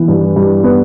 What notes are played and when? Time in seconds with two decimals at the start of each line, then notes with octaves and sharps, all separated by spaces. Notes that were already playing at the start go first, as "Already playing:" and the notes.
Already playing: E3 B3
0.08 G2
0.36 G2
0.64 B3